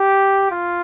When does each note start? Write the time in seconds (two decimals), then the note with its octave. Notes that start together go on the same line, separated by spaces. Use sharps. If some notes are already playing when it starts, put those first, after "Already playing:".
Already playing: G4
0.51 F4